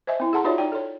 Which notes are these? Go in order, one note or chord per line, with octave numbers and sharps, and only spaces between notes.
C5 D#5 E5 G#5
C4 E4
G#4 A4 F#5 A5 A#5 C6
D#4 F4 F#4 C#5 D5 E5
D#4 D5 G5
A4 C#5